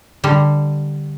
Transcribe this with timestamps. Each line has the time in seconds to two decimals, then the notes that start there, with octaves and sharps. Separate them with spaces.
0.24 D3 G3